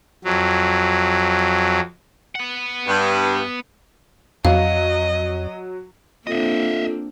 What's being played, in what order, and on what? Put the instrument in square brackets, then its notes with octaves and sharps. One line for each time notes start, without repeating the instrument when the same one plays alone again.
[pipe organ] F2 F#3
[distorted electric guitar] B3 F#5
[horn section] G2
[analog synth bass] F2 [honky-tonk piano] F#3 [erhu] D#5 [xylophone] F5
[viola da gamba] A#3 C4 D4 [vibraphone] F4 A4 [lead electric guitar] D#5 E5